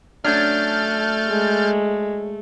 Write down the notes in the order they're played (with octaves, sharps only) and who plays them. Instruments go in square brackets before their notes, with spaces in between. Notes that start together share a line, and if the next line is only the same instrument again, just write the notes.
[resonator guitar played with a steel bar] F#3 C#4 D4 [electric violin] A3 [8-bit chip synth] F6 G6 A6
[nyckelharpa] G#3